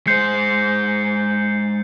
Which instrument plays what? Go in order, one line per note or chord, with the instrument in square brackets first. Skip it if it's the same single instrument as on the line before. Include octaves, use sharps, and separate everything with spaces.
[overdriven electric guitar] G#3 C5 [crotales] G6 C7 C#7